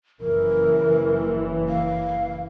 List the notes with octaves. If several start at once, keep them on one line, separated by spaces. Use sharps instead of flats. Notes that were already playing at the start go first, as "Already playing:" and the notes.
F#1 E3 A#4
F5